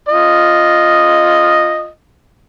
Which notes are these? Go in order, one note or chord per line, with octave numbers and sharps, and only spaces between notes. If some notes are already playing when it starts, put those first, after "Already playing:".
F4 D#5